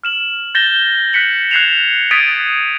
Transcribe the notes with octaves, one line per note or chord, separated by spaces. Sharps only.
F6 E7 F#7
G6 A6 A#6 E7 G7
F#6 B6 C#7 F#7
F#6 G#6 C7 C#7 E7 F7
D#6 G#6 A6 B6 D7 D#7